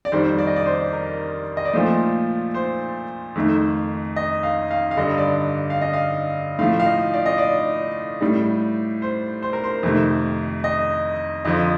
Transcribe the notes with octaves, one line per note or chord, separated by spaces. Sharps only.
D5
F2 D#3 G3 C5
D5
D#5
D5
C5
A#4
D#5
D5
A#2 F3 A3 C5
C5
F2 D#3 A3
D#5
F5
F5
F5
G2 D3 G3 D#5
D5
F5
D#5
F5
A2 F3 A3 F5
F5
D#5
D5
D#5
D5
A2 G3
C5
C5
A#4
C5
F2 C3 D#3 A3
D#5
F2 D3 F3 D#5